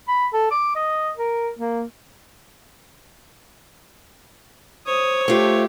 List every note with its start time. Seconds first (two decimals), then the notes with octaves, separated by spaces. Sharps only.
0.08 B5
0.33 A4
0.51 D6
0.76 D#5
1.17 A#4
1.59 A#3
4.87 C5 C#5 D#6
5.28 A3 F4 G4